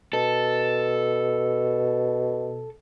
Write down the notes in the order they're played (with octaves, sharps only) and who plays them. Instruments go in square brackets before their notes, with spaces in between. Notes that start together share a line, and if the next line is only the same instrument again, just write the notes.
[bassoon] B2 [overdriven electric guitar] A4